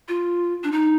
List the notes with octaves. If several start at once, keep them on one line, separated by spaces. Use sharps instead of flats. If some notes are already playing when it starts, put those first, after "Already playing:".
F4
D4
D#4